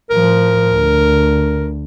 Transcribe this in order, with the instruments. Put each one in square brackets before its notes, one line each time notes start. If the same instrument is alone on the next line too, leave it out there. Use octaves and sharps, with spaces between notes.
[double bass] A2 F3 [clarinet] A#4
[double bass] D2